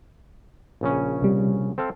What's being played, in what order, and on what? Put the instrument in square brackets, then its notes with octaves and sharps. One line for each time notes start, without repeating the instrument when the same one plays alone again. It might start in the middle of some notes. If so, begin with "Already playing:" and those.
[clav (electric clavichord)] A#1 C#3 C#4
[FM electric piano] C3 G3
[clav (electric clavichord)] C4 A4 F5